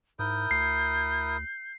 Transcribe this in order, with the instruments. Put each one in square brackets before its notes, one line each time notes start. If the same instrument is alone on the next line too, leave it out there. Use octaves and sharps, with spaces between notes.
[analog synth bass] G#2 [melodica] E4 A#4 D#6 [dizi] G6
[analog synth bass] D2 [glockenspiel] C7